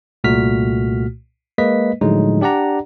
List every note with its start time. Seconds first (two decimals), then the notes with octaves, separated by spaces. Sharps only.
0.24 C2 A#2 A3 F#4 F6 B6
1.58 G#3 A#3 B4 D#5 B6
2.01 A2 D3 F3 F#3 G#3 D#4
2.41 D4 G4 D5 F#5 A#5